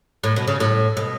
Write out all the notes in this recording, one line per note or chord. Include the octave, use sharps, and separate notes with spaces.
A2
B2
C#3
A2
B2